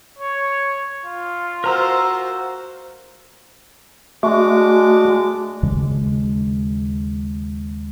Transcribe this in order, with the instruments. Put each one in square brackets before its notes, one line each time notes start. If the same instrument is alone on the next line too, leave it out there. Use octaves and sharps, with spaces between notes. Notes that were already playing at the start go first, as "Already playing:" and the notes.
[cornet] C#5
F4
[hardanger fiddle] F#4 C5 [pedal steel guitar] A#4 A#5 E6
[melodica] G#3 D4 D6 [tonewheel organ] A3 F#4
[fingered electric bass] D#2 C#3 G#3